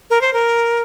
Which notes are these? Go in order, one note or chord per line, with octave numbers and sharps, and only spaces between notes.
A#4
C5
A#4